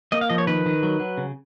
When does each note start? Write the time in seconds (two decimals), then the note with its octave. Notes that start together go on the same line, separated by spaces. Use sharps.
0.12 A#3 D#5
0.21 F5
0.29 F3 D#5
0.38 C#5
0.47 D#3 B4
0.66 D#3
0.83 F#3
1.00 F#3
1.18 C#3